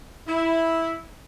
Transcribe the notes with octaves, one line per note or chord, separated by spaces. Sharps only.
E4